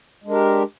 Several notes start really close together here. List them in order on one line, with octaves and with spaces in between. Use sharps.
G#3 D4 A#4 G4